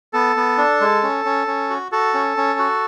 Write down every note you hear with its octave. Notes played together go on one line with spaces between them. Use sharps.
B3 A4
B3
D4
G#3
C#4
C#4
C#4
F#4
F#4 A4
C#4
C#4
F#4